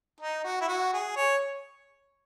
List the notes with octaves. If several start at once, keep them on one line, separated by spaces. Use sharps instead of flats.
D#4
F#4
E4
F#4
G#4
C#5